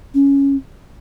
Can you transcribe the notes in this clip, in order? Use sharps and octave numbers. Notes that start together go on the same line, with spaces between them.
C#4